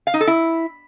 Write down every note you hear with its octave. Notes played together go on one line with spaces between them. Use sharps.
F5
D#4
A4
E4